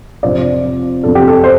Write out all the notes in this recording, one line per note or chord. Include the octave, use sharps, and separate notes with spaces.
F2 C3 F3 D4 D5
F2 C3 F3 D4 A4
G4
A4
C5